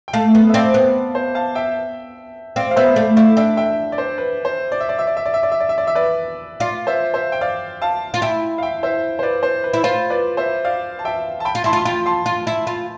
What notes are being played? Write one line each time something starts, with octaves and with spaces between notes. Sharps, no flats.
G5
A3 F5 A5
B3
E5
C4 D5 F5
B3
C5
F5 A5
E5 G5
C4 D5 F5
F5
B3 C5 E5
A3 D5 F5
E4 D5 F5
D4 E5 G5
E5 G5
D5
C5
B4
C5
D5
E5
D5
E5
D5
E5
D5
E5
D5
E5
D5
E5
D5
E5
B4 D5
F4 D5 F5
C5 E5
C5 E5
G5
D5 F5
F5 A5
F4
E4 E5 G5
F5
E5 G5
C5 E5
C5
B4 D5
C5
B4
E4
F4 C5
B4 D5
C5 E5
D5 F5
A5
E5 G5
A5
G5 B5
F4
E4 A5 C6
F4
C6
F4 G5 B5
A5 C6
F4
E4
F4